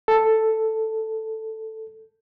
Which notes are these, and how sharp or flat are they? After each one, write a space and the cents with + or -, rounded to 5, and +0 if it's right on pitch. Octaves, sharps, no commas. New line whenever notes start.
A4 +5